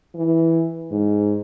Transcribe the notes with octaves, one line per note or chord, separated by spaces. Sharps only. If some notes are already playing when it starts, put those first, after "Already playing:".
E3
G#2